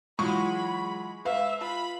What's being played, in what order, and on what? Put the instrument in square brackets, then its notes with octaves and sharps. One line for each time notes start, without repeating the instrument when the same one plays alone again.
[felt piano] E3 F#3 F4 [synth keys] G#3 [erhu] B5 [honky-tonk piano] C#6
[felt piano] B4 F5 [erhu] E5
[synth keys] F4 [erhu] B5